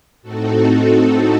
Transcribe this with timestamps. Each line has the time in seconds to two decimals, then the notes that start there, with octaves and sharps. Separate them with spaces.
0.22 A2 A3 C4 D#4 F#4 A4